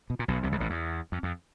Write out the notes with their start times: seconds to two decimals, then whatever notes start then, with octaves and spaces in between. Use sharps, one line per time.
0.10 B2
0.19 A#2
0.28 B1 B2
0.43 C2 C3
0.52 C#2 C#3
0.60 A1 A2
0.70 E2
1.12 F2
1.23 F2